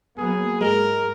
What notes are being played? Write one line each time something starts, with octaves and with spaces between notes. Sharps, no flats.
F#3 A#3 B3 G#4
G#2 G#3 A#4